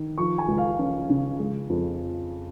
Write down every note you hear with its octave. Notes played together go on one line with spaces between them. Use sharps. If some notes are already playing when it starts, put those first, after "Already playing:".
Already playing: D#3
F3 C#6
G#5
C#2
F5
C#4
C#3
G#3
F2